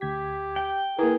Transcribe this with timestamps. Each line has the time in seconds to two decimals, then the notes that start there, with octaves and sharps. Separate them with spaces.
0.01 D2 G4 G#6 B6
0.56 G5
0.98 A#3 E4 G#4 A#4 B4